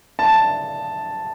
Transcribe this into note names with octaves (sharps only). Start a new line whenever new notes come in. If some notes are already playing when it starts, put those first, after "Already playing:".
A5